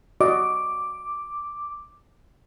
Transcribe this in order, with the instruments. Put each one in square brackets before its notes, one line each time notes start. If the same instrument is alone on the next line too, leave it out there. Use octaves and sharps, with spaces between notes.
[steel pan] F#4 D5 D#5 [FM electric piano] D6